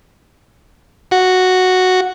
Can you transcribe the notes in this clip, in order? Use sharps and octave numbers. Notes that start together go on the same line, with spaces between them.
F#4